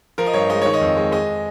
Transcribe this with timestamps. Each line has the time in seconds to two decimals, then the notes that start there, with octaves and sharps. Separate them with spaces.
0.18 F3 A#4
0.26 D#5
0.33 G2 C#5
0.50 G#3 D#5
0.62 D#3 C#5
0.74 D#5
0.81 F2
0.96 G#3
1.12 G#3 D#5